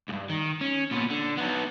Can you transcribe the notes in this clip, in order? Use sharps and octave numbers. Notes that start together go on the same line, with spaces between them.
C#2 G2
D#3
C#4
A#2 B3
D3
B3 D#4